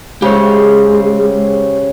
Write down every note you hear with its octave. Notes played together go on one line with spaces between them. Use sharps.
C#3 G#3 G4 C5 C#5